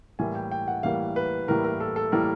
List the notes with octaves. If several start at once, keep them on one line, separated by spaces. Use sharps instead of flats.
A2 E3 G3 A#3 G#5
G5
G5
F#5
A2 E3 G3 A#3 F5
B4
A2 E3 G3 A#3 A#4
A#4
A4
A4
A2 E3 G3 A#3 A#4